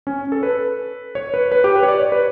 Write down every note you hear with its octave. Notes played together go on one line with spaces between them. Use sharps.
C#4
A4
B4
C#5
B4
B4
G4
B4
C#5
D5
C#5
B4